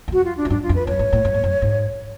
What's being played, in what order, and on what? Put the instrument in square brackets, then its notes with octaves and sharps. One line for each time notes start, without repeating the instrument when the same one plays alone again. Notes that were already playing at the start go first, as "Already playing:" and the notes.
[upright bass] F#2
[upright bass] F2 [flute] F#4
[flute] F4
D4
[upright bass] F#2
[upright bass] G#2 [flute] D4
[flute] F4
[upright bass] F2
[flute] B4
[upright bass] F#2 [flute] C#5
[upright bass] G#2
A2
F#2
G#2
F#2
G#2